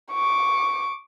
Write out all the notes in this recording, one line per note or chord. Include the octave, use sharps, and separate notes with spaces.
C#6 D6